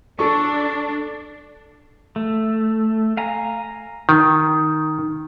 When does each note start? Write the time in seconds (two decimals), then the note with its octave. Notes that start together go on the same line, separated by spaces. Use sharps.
0.19 D4 A4 C#6
2.16 A3
3.17 F5 G#5 A#5
4.09 D#3